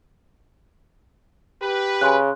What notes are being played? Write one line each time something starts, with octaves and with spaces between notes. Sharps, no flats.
G4 B4
C#3 G#5 C6 F#6